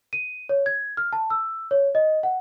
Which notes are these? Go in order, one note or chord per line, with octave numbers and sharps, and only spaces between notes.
D#7
C#5
G#6
F6
A5
E6
C#5
D#5
F#5